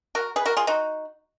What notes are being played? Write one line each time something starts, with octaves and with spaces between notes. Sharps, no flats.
F#4 A#4
G#4 B4
F#4 A#4
F4 G#4
D#4 F#4